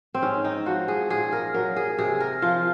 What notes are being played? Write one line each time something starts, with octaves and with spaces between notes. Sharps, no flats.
C4
G#2 C#4
D#4
F3 F#4
G#4
A#2 G#4
A#4
F#3 A#4
G#4
C3 G#4
A#4
F3 F4